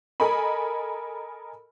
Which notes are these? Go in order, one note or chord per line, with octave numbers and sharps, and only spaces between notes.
A4 A#4 D#5 G#5 B5